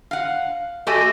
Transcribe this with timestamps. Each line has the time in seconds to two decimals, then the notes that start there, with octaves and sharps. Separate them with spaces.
0.11 F5 F#5
0.87 A3 F#4 G4 A4 D#5 G#5